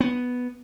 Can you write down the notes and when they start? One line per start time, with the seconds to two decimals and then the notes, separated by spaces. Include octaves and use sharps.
0.01 B3